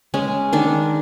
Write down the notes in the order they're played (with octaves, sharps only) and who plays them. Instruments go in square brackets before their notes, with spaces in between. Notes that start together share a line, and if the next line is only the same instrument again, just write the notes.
[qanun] G#3 C#4
D#3 D4